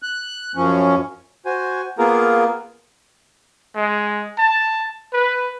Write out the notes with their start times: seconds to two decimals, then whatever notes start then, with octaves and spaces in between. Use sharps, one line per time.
0.02 F#6
0.56 F#2 F3 C#4
1.45 F#4 C5 G#5
1.98 A#3 B3 F4 G#4 A#4
3.76 G#3
4.38 A5
5.13 B4